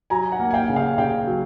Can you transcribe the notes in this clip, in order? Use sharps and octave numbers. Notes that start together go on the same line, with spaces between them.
F#3 G#5 A#5
F#5 G#5
A#3
G#5
F5 G5
C#3
F5 G5
C#3 F5 G5
F#3